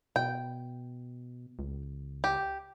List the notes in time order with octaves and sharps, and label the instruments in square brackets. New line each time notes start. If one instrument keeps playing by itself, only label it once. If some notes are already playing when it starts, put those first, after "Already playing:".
[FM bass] B2 [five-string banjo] G5
[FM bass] C#2
[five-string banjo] G4